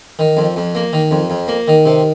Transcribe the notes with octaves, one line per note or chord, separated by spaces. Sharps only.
D#3
F2
F2
A#3
D#3
F2
F2
A#3
D#3
C3